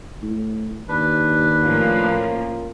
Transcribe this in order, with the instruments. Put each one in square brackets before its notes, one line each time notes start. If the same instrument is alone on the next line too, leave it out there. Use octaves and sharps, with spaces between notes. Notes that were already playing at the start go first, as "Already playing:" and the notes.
[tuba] A2
[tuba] D#2 [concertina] D4 B4
[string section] A2 F3 A#3 [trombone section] C#4 F4 A#4